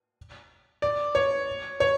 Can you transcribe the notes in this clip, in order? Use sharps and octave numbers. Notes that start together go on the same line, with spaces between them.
D5
C#5
C#5